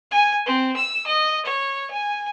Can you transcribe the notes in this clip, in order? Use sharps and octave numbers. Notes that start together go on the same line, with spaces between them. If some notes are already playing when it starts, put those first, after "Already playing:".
G#5
C4
E6
D#5
C#5
G#5